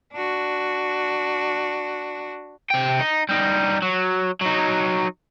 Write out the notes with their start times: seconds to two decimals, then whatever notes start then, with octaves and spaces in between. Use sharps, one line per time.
0.13 D4 F#4
2.71 C3 G5
3.00 D#4
3.29 G3 D#4
3.82 F#3
4.41 F#3 D#4